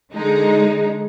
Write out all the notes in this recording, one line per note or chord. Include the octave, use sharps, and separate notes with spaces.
D3 G#3 D#4